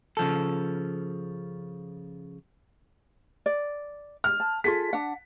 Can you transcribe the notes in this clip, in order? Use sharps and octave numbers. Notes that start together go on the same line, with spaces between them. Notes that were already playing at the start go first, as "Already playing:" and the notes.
C#3 F3 A4
D5
F6
A5
F4 G#4 A4 B6
D4 F#5